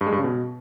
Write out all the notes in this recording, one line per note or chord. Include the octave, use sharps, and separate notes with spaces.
G2
G#3
G2
C#3
B2